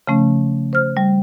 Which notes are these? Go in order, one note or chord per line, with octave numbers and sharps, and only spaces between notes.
C#3 F3 A3 C#4
C5 F6
G3